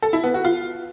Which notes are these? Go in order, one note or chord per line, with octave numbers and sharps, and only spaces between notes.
A4
E4
B3
F#4
F4